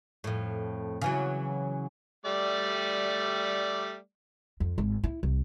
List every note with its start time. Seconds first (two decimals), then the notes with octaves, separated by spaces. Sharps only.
0.24 F2 A2
1.02 C#3 E3 F#3
2.25 G3 A3 D5
4.60 F2
4.78 G#1
5.04 E4
5.23 C2